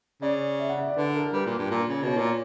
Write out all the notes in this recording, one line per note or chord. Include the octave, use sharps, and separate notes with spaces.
C#3 D5
E5
F#5
E5
D5
D3 B4
A#4
A#4
G3 B4
A#2
G2
A#2
C#3
B2 C#5
A#2